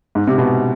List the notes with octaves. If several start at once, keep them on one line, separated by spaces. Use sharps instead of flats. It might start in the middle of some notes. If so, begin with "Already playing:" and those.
G#2
C3
B2